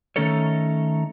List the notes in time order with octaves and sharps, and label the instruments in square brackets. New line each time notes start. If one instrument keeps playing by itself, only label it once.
[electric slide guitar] D#3 A3 C#4 D#4 A4 C#5